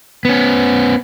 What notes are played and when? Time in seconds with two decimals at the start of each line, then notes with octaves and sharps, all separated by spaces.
0.25 B3 C#4